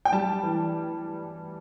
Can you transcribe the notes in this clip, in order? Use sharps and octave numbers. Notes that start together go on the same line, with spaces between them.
G5
G3 A5
E3